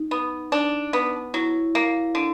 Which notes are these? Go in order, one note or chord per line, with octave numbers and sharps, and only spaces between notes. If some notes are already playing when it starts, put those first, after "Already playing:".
Already playing: D#4
B3
D4
B3
F#3 E4
A#3
D3